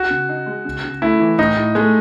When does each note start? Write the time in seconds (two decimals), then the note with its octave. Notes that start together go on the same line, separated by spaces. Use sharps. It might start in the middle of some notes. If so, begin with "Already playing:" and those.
Already playing: F#4
0.10 C#3
0.29 D#4
0.46 G#3
0.65 C#3
0.84 C#3
1.02 A3 E4
1.20 E3
1.38 A2 D#4
1.56 A2
1.75 G#3 A3